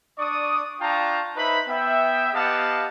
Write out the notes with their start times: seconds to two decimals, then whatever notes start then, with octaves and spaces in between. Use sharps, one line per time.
0.19 D4 D5 C#6 D#6
0.81 D4 F4 G5 A5 A#5 C#6
1.37 D#4 B4 C5 E5 B5
1.68 B3 E5 G5
2.33 B3 G4 D#5 F5 F#5 A5